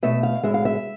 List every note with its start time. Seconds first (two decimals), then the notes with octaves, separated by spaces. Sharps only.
0.03 B2 A3 E5
0.23 F5
0.43 A2 G#3 E5
0.54 F5
0.65 E5